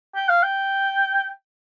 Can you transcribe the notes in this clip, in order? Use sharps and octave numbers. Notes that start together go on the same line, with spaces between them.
G5
F5
G5